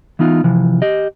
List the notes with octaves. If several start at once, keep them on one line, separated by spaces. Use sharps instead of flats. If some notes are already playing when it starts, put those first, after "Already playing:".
E3 B3 D#4 F4
C3 E3 F3
G4 D#5